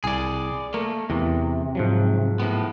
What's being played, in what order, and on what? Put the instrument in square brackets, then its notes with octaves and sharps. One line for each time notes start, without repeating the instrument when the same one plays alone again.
[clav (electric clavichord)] C2 G#5 [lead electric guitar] G#4 D5
[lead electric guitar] A3 A#3 [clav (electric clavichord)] A#4
[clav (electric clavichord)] E2 [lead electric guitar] C3
[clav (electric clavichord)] G#2 F3 F#3
[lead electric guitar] A2 B3